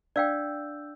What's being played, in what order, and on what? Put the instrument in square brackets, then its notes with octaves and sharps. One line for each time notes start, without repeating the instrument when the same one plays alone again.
[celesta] D4 E6 G6 [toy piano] D5 F5 G5